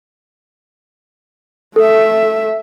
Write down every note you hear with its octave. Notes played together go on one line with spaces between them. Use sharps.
A3 A4 E5